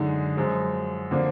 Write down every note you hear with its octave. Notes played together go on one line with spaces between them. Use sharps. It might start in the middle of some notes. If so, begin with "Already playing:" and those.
Already playing: F#2 D3 G#3 D#4
F#2 F3 G#3
D3 F3 A#3 D4